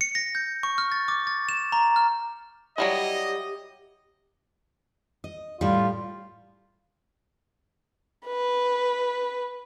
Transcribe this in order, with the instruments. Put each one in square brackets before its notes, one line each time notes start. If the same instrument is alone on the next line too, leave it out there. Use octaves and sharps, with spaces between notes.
[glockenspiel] C#7
A#6
G6
C#6
F6
A6
D6
A6
E7
A#5
F6
[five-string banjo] F#3 G3 E4 [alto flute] G4 [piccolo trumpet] D#5
[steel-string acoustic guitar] D#5
[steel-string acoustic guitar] A2 G3 [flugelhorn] F4
[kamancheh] B4